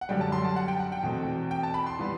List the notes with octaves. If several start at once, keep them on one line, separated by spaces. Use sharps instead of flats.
F#5
F#2 D3 G3 G5
A5
C6
A5
F#5
G5
F#5
G5
E2 B2 A3 C4
G5
A5
B5
C6
E3 G3 B3